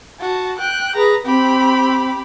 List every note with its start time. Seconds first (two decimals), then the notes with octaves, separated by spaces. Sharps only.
0.21 F#4 A5
0.59 G5 F#6
0.95 G#4 B4 A#5
1.26 C4 G4 B5